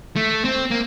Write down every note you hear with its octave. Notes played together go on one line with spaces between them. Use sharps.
A3
C4
A#3